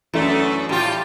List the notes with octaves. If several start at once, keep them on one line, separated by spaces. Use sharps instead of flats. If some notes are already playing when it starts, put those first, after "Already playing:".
F#2 E3 A3 D4
A2 F3 G3 F4 G4